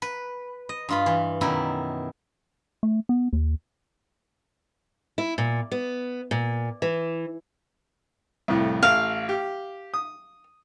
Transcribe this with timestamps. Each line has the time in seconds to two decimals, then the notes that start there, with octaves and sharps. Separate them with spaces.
0.02 B4
0.69 D#5
0.89 G2 F4 B5
1.06 E3
1.41 F#2 B2 D#3 E4
2.83 A3
3.09 B3
3.33 D#2
5.18 E4
5.38 A#2
5.71 B3
6.31 A#2
6.82 E3
8.48 C2 F2 A2
8.83 A1 F5
9.29 G4
9.94 D#6